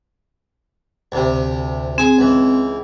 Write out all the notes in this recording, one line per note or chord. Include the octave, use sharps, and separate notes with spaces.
D2 C3
C4 G#4 G#5
C#2 E3